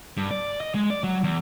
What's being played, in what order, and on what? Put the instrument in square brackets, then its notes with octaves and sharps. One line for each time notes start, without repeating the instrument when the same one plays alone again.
[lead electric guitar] G2
D5
D#5
G#3
D5
F#3
E2